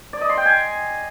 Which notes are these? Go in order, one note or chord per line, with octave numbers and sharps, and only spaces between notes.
D5
D#5
C6
G5
G#5